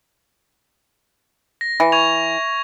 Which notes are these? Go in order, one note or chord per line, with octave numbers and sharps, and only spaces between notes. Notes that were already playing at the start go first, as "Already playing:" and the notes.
A#6
E3
C#6 G#6 F7